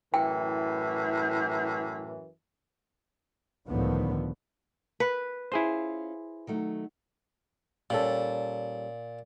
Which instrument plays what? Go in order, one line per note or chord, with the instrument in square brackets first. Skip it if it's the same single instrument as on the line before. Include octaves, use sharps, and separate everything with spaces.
[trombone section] F#2 E3 [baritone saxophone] A2 [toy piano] G5
[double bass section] C#2 A2 D3 D#3 F3 B3
[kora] B4
[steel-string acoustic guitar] C#4 F4 [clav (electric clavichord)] E4 G#4 C5
[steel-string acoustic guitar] D#3 F#3 A3
[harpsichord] A#2 [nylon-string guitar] G3 C#4 A4